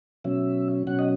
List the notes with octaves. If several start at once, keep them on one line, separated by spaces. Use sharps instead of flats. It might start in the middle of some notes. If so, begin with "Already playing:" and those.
B2 F#3 C#4 E5
B2 F#3 C#4 F#5
D#5